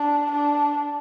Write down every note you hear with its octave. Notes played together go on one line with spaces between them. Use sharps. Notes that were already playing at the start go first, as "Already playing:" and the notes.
Already playing: D4
D4